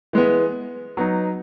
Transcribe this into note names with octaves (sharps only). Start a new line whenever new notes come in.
E3 G#3 B3
F#3 B3 D#4